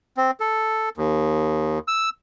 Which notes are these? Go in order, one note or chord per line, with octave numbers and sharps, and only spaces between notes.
C4
A4
D#2
E6